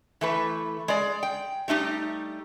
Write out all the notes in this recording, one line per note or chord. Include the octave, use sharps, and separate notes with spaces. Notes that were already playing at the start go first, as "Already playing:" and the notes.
E3 A3 B4
G#3 D5
G5
G3 A3 D#4 G4